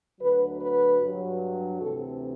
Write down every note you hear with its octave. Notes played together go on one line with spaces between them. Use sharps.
D2 D3 F#3 B4
B4
G2 F#3
D2 C3 E3 A4